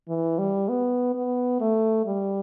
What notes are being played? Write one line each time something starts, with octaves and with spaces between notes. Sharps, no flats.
E3
G3
B3
B3
A3
G3